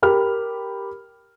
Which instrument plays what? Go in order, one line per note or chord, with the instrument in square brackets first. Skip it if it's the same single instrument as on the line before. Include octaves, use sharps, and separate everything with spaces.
[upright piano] G4 A#4 B5 F6